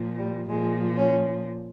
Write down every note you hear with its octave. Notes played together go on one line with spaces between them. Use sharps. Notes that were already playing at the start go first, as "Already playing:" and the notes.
Already playing: A#2 F3
G3
A#2 F3 G#3
C#4